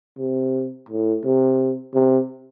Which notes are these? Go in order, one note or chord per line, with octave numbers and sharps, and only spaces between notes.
C3
A2
C3
C3